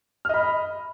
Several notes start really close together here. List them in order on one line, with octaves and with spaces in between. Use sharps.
F6 D#5 B5